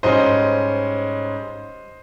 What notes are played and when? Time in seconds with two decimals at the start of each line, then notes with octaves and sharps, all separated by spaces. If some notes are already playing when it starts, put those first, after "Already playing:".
0.03 G#2 G3 C#4 C5 D#5